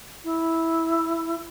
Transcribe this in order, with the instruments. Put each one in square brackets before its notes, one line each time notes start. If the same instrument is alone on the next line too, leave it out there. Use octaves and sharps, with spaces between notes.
[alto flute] E4